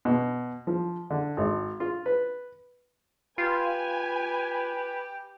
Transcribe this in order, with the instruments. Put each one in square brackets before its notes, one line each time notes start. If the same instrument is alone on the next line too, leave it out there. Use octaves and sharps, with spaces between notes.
[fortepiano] B2
F3
D3
G#1
F4
B4
[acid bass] F4 [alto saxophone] G4 [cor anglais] B4 [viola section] G#5